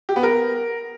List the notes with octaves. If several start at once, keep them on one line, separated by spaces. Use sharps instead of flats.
G4
B3
A#4